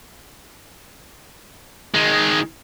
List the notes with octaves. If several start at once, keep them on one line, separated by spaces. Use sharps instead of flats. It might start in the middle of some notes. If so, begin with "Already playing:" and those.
D#3 G#3